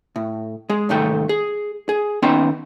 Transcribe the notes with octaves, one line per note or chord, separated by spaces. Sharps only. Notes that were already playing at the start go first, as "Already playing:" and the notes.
A2
G#3 G#4
C2 G#2 D#3 A3 G5
G#4
G#4
D#2 B3 C#4 D#4 G5 C6